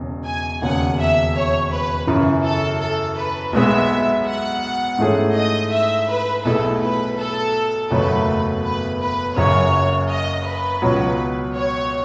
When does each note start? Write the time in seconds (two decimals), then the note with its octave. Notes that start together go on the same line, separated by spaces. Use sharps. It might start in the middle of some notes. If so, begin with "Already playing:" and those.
Already playing: E1 E2 C#3
0.26 G#5
0.62 E1 D#2 C#3 F#5
0.99 E5
1.35 C#5
1.72 B4
2.07 F#2 C#3 E3
2.44 A4
2.81 A4
3.17 B4
3.53 B1 B2 G#3 B3 E5
4.27 F#5
4.98 G#2 E3 A3 C#4 G#4
5.35 D#5
5.71 E5
6.08 B4
6.45 B1 B2 A3 E4 G#4 A4
6.81 B4
7.17 A4
7.90 F#1 E2 B2 F#3 A3 B4
8.64 B4
9.00 B4
9.36 F#1 F#2 C#3 F#3 C#5
10.09 D#5
10.45 B4
10.82 C#2 B2 F#3
11.54 C#5